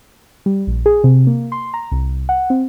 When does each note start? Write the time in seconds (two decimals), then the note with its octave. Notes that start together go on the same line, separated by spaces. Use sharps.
0.46 G3
0.67 A#1
0.86 G#4
1.04 C3
1.27 A#3
1.52 C6
1.74 A#5
1.92 C2
2.29 F#5
2.50 C4